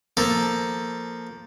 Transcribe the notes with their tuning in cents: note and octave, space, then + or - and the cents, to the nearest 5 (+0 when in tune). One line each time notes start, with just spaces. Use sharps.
F3 +0 A#3 +0 A4 +0